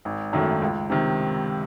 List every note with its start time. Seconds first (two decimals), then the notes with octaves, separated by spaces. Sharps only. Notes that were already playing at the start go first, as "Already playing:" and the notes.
0.05 G#1
0.33 F#2 D#3 F#3 A3
0.62 C#2
0.90 C3 D#3